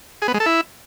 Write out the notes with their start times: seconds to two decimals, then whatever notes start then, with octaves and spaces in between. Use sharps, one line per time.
0.22 G#4
0.28 B3
0.34 G#3
0.40 A4
0.46 E4